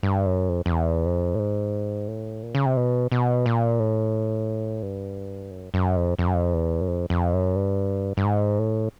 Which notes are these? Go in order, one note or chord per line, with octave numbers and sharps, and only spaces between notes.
G2
F#2
F2
F2
E2
F2
A2
G#2
A2
A#2
C#3
C3
B2
B2
A#2
A2
G2
F#2
F#2
F2
F2
F#2
F2
E2
F#2
F2
F2
F#2
G2
G2
G#2
A2